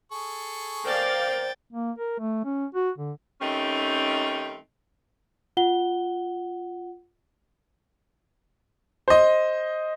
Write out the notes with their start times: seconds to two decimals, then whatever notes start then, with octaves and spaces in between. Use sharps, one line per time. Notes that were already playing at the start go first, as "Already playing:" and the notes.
0.12 G#4 A4 C#6
0.85 A#4 C5 D5 F5 G5 A6
1.73 A#3
1.99 A#4
2.20 A3
2.45 C#4
2.75 F#4
2.98 D3
3.41 D#3 G3 A3 C4 C#4 D#4
5.57 F4 F#5 G7
9.08 C5 D#5